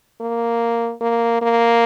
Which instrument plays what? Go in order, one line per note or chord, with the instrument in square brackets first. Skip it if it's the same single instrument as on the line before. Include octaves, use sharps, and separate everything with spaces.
[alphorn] A#3
A#3
A#3